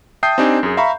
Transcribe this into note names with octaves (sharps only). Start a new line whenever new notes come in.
E5 G5 A5 D#6 G6 C7
C4 D4 D#4 G4 G#5
F#2 G#4
E5 F5 A#5 B5 C#6